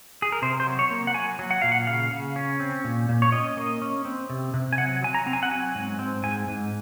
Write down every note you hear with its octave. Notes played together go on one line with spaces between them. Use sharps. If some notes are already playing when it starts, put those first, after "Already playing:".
G#4
A#4
C3 C5
C5
F#3
C#5
A#3
F#5
F#3 G#5
F#3
F#5
A#2 F5
F#5
C#3 F5
C#3
C#4
C4
A#2
A#2
C#5
C#4 D#5
A#3
C#4
C4
C3
C3
G#5
F#3 F#5
F#3 G#5
A#5
C4
G#5
F#5
F#3 G#5
G#2
C4
G#2 G#5
G#2